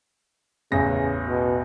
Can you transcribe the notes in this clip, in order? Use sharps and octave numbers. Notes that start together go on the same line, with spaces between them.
A1 E2 C#3 A#6
B2